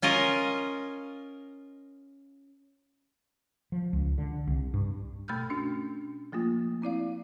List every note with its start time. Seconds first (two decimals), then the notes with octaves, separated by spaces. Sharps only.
0.02 C#4 F4 A#4 D#5
3.72 F3
3.93 C#2
4.18 D3
4.47 C2
4.74 G2
5.28 B2 A3 B5 E6 F6 G6
5.50 C#4 D4 F#4
6.32 F3 A3 A#3 F4
6.82 C4 E4 D5 F5